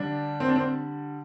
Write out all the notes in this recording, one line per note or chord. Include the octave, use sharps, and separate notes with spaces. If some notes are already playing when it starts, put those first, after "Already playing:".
Already playing: D3 G3 D4
C4
D4
C4